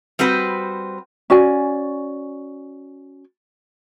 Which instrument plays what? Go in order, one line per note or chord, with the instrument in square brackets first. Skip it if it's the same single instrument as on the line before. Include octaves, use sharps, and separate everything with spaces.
[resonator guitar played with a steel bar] G3 C4 F#4 B4 C5
[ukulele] C#4 F#4 D5 G#5